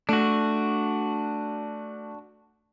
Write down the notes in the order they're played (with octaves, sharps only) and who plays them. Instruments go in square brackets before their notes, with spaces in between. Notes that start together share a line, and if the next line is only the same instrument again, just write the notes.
[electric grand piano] A3 [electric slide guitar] D4 F#4